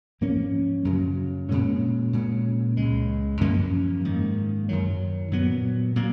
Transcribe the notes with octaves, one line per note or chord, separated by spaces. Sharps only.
G#2 F3 A#3 C#4
F#2 C#3 F#3
A#2 G#3 C#4
A#2 G#3 C#4
C#2 C#3 G#3
F#2 F3 A#3 C#4
G#2 D#3 A#3
F#2 D#3 F#3
A#2 F#3 B3
A#2 F#3 A#3